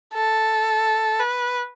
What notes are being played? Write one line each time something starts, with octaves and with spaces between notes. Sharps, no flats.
A4
B4